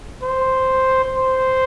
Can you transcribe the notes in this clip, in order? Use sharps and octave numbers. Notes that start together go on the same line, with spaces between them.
C5
C5